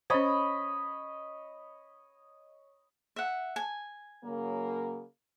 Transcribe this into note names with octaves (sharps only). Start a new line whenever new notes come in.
C#4 C5 C#5 D#5 B5
E5 F#5
G#5
C#3 F#3 A#3